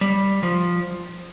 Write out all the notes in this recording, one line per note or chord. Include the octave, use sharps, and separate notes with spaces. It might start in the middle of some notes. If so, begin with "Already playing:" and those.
G3
F3